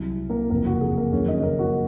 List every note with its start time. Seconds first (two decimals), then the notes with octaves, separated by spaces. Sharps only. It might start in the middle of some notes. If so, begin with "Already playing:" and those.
Already playing: C2 C3 F#3
0.30 A#3 A#4
0.50 F#1 F2 C3 A#3 A#4
0.66 F#4
0.81 G#4
0.97 A#3 A#4
1.12 F#1 F2 D#3 F#3 C#4 C#5
1.28 D#4 D#5
1.43 A#3 A#4
1.59 F#4